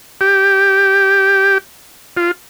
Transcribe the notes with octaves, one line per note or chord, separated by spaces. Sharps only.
G4
F4